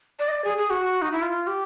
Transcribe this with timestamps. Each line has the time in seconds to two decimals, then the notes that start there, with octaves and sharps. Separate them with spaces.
0.19 D5
0.28 D#5
0.32 D5
0.44 G#4
0.58 G#4
0.70 F#4
1.02 D#4
1.12 E4
1.22 F4
1.47 G4